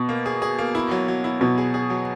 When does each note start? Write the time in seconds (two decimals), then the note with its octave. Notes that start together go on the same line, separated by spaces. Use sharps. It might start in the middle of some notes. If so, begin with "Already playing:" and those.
Already playing: B2
0.09 A#3
0.26 G#4
0.42 G#4
0.58 A#3
0.75 E4
0.91 F#3
1.08 F#3
1.24 E4
1.41 B2 F#3
1.58 G#4
1.74 G#4
1.90 F#3